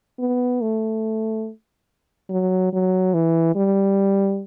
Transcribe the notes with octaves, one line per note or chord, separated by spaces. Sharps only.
B3
A3
F#3
F#3
E3
G3